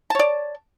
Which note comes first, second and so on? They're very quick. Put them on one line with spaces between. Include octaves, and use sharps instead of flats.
A5 C#5 D5